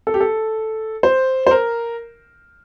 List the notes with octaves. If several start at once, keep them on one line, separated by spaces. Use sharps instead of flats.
A4
G4
A4
C5
C5
A#4